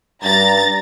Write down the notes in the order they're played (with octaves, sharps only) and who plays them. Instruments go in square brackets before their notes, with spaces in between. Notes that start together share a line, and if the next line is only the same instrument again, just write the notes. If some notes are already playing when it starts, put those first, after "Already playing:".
[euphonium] G2 [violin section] A#5 A6